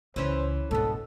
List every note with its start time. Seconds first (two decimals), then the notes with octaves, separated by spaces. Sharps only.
0.16 C#2 E3 C#4 C5
0.71 G1 G#2 B2 B3 A4